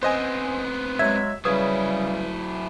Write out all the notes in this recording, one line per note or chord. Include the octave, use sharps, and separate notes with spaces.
B3 C4 C5 D#5 G#5
F#3 G#3 E5 G#6
C#3 F#3 G3 E4 B4 D#6 G#6